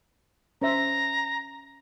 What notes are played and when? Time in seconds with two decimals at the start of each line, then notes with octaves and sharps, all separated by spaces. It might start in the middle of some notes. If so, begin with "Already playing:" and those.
0.62 C#4 C5 E5 A#5